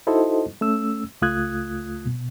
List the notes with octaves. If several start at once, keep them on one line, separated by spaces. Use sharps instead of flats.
D#4 E4 F#4 A4 C5 D#5
A3 C#4 E6
C#2 A3 F4 D#6 F#6 G#6
B2